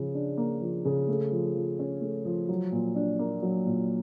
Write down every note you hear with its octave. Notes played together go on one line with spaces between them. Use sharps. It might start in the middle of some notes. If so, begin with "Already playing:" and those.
Already playing: C#3 F3
D4
A#3
F3
C#3
A3
F3
F3
C#4
A3
F3
F#3
A#2
D4
A#3
F#3
A#2